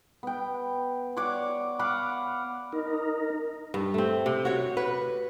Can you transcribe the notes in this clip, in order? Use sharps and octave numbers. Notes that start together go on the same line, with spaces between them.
B3 G5
C#5 D5 F#5 D6
F5 F#5 B5 D6
D#4 A#4
G2
A3 C4
C3
F#4 C#5
B4